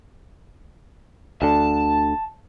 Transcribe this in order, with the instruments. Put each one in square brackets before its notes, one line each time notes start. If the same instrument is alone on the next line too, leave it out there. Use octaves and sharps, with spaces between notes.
[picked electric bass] D2 D3 [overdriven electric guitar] A5